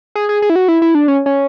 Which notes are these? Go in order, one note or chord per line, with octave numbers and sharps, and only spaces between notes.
G#4
G#4
G#4
E4
F#4
E4
E4
D4
C#4
C#4